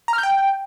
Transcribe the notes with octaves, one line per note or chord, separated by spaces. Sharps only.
A#5
F6
G6
G5